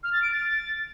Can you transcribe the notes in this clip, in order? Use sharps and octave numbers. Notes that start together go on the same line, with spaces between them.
F6
A6
D7
A6